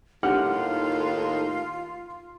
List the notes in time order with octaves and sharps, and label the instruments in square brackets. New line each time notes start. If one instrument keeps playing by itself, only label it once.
[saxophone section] D#2 A2 D#3 [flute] F4 [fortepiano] G4 F#5 F6